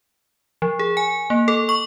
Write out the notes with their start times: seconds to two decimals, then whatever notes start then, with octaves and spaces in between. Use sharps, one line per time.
0.62 F3
0.79 G#4
0.97 G#5
1.30 A#3
1.48 A4
1.69 C#6